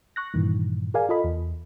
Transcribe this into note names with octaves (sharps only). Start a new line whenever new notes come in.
C#6 F#6 A#6
G2 A#2 D#3 E3
G#4 A#4 D5 F5 G#5
F4 A4 D#5 B5
E2